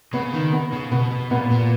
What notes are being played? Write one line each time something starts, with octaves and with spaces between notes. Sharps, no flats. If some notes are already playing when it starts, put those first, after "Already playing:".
C#3 B3
D#3
B3
C#3
B2 B3
B2
A#2 B3
A#2